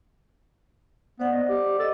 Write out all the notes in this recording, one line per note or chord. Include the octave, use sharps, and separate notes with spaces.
B3 C5 D5 F#5
D#5
G4
A4 D#5 D6